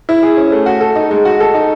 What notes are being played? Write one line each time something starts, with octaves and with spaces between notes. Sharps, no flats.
E4
G#4
C#4
A3
F#4
A4
D#4
G#3
F#4
A4
D#4